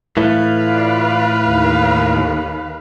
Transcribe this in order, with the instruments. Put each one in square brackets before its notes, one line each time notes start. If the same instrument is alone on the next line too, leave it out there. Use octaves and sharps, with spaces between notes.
[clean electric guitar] A2 E3 A3 [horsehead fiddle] B4 F5
[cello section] F4 D5
D#2 D#3